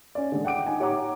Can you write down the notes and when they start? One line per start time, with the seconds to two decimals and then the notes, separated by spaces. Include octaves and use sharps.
0.15 C#4 D5
0.32 D3 G#3
0.45 F#5 G5 D6 D7
0.66 D#4 G#5
0.80 G4 C#5 F#5 A#5 D6